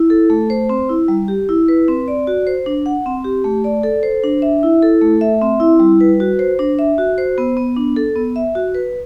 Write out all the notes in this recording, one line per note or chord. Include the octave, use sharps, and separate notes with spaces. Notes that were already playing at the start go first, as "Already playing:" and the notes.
Already playing: E4
A4
A3
C5
C4
E4
G3
G4
E4
B4
C4
D5
F#4
C5
D4
F#5
C4
G4
A3
D5
A4
C5
D4
E5
E4
A4
A3
E5
C4
E4
G3
B4
F#4
C5
D4
E5
F#4
C5
B3
B3
D4
A4
B3
E5
F#4
B4